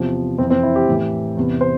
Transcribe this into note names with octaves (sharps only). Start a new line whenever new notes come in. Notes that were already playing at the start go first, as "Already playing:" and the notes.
Already playing: E2 C3 F3
F2 E3 C4
C4
E4
G4
A2 E3
E2 C3 E3
C5